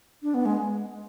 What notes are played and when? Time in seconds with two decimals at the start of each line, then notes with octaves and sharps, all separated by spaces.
0.23 D4
0.34 B3
0.45 G#3